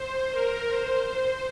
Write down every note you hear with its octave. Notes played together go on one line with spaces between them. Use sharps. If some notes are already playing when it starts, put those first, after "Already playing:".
Already playing: C5
A#4
C5
C5